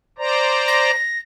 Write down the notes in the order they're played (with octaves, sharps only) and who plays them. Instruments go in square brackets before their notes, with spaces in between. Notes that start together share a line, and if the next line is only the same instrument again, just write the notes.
[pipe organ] C5 D5 A#5
[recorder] A#6